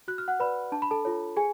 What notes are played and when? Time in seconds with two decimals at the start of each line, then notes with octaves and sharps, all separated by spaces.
0.08 F#4 F#6
0.18 F6
0.28 F#5 F#6
0.40 B4 D5 B5
0.72 D4 A5
0.82 B5
0.91 A4 A5
1.05 F4 A4 C#5
1.37 G#4 G#5